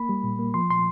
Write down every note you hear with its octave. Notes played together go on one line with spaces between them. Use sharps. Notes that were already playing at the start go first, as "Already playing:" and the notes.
Already playing: A#3 B5
G3
A#2
A#3
F3 C6
A#2 C6